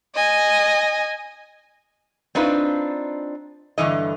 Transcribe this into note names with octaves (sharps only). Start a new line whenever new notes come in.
D#5 G#5
C4 D4 D#4 F4 B4
G2 D3 E3 D#5